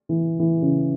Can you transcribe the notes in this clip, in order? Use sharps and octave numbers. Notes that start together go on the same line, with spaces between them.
E3
E3
C#3